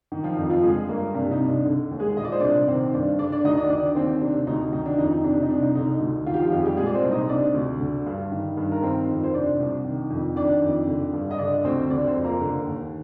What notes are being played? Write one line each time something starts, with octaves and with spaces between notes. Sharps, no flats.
D#3
F3 F4
F2 D#4
F3 F4
D3 G#3 G#4
G2 A#3 A#4
C3 D4
D#4
C2
D4
D3
D#2
G#3 G#4
A#2 D#5
D5
C5
C2 D4 D5
D#3 C4 C5
G2 D4 D5
D3 D4 D5
D4 D5
D2 D#4 D#5
D4 D5
D#3 D4 D5
D5
D#2 C4 C5
C3 D4
D2 D#4
D#3 D#4
D4
F2 D#4
D#4
C3 D4
D#4
C2 D4
D#4
D3 D#4
D2
D#3 F4
G4
F3 F4
F2 G4
G#4
G3 G4
A#2 G#3 G#4
D5
C4 C5
C2
D#4 D#5
C3 D4 D5
D2
D3
G2
D#3
G2
A#4
D#3 C4 C5
F2
C5
C3 D4 D5
C2
D#3
F2
D#3 D4 D5
F2
D3
G2
D#5
D3 D4 D5
D2 C4 C5
D3 D4 D5
C4 C5
F2
A#3 A#4
D3
D#2